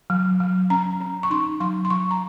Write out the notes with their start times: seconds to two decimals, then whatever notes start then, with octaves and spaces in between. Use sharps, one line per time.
0.10 F#3
0.40 F#3
0.70 C#4 A#5
1.01 C#4
1.23 C#6
1.30 D#4 C6
1.60 F#3 C6
1.85 C6
1.90 F#3 C#6
2.11 A#5